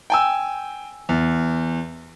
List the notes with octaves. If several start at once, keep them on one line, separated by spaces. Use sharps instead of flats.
G5 G#5 E6
E2